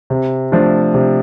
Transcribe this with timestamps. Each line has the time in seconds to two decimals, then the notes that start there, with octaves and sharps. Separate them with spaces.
0.10 C3
0.52 F3 A3 D4
0.94 C3